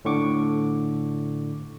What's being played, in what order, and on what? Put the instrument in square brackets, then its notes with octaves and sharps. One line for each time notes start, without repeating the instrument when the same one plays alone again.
[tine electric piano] A2 D3 C#6 D6